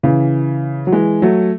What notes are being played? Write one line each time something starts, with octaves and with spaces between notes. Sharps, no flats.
C#3 E3
F#3
E3 G#3
F#3 A3